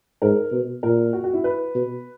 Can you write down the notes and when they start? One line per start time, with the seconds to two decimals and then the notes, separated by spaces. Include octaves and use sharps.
0.22 G#2 A#4
0.52 B2
0.83 A#2 A#4
1.13 F#4
1.24 F#4
1.33 E4
1.44 B4
1.75 B2